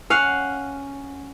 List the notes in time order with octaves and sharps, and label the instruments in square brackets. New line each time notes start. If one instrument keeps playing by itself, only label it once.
[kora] C#4 F5 F#5